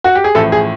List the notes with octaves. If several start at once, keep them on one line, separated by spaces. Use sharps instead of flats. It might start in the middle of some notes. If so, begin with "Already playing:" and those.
F#4
G4
G#4
A1 A2 F3 A4
G#4